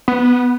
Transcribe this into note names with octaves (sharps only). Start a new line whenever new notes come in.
B3